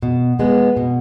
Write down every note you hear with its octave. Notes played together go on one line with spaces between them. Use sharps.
B2
G#3 B3
B2